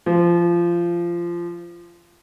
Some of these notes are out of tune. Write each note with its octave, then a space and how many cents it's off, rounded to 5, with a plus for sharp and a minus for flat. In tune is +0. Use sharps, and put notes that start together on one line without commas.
F3 -20